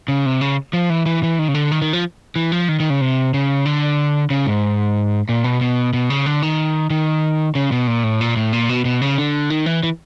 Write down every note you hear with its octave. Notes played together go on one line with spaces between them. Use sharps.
C#3
C3
C#3
F3
E3
E3
E3
D#3
C#3
D3
D#3
D#3
F3
E3
F3
D#3
D#3
C#3
C3
C#3
D3
C#3
G#2
A#2
B2
B2
B2
C#3
D3
D#3
D#3
C#3
B2
A#2
A2
A#2
A2
A#2
B2
B2
C#3
D3
D#3
E3
E3